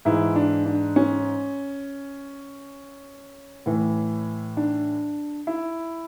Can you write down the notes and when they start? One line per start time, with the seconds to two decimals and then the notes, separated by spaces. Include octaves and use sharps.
0.05 G#2 E3 E4
0.36 D4
0.66 D4
0.96 C#4
3.66 A2 E3
4.57 D4
5.47 E4